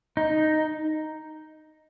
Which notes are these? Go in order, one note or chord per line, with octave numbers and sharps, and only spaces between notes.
D#4